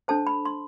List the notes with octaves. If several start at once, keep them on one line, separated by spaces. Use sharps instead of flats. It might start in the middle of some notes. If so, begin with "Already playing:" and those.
D4 A4 C5 A5
B5
C6